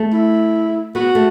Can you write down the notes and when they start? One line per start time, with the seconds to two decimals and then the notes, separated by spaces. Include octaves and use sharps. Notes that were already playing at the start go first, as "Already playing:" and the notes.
Already playing: A3
0.13 E4
0.95 B3 F#4
1.15 A3